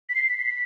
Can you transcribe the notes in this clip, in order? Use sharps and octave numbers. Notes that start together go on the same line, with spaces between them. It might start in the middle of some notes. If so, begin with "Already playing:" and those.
B6
C7
B6
C7
B6